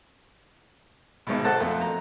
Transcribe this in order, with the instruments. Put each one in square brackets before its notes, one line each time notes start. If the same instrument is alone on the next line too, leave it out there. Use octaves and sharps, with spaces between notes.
[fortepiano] G#1 G#2 B2
A4 C5 F#5 A5
F2 A3 F4
A#5